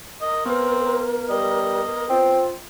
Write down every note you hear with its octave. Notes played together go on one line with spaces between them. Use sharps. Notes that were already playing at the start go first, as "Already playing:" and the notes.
A#4 D#5
B3 C4 B4
G3 D#5
C4 F4